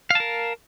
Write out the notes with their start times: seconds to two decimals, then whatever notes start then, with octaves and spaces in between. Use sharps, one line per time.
0.10 F5
0.15 A5
0.20 A#4